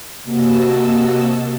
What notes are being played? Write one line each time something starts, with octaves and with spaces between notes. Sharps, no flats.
C3 A#3 F#4 D#5 A5 E6